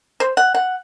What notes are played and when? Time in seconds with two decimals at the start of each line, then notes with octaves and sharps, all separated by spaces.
0.20 C5
0.37 F#5
0.54 F#5